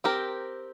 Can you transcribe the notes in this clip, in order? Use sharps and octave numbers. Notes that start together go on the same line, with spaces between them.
C4 G4 A#4